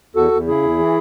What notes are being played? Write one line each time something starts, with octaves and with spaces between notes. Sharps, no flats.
E2 F#4 A4
E2
C#3 E4 G#4
E2
E3